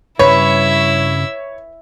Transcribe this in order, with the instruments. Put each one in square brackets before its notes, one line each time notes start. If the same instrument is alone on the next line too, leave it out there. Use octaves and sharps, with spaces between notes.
[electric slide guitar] G2 C#3 G3 [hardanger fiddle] E4 E5 [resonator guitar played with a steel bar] B4 [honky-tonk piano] C#5